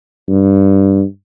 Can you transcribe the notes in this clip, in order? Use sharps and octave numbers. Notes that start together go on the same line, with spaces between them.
G2